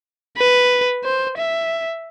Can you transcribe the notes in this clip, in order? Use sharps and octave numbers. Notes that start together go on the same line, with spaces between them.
B4
C5
E5